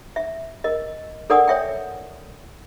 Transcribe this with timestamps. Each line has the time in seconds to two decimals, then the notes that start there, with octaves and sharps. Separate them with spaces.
0.16 E5
0.64 A#4 D#5
1.30 A4 A#4 D5 F#5 G#5 D#6
1.48 C#5 E5 G5